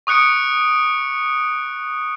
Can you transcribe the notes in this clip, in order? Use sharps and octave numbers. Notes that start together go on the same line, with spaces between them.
C#6 D#6 F#6 C#7 D7